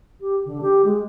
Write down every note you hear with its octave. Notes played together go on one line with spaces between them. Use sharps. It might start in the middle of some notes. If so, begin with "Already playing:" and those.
G4
D3
G4
G#3